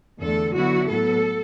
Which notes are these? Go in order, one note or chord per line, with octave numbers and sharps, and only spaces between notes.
E2 D3 A3 A4
D3 F#3 B3 E4 F#4
A2 F#3 B3 A4